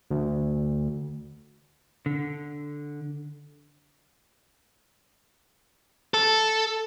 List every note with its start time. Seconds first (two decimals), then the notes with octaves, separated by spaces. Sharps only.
0.11 D2
2.06 D3
6.14 A4